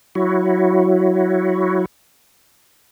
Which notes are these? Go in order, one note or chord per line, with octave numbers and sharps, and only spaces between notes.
F#3 E4 F#4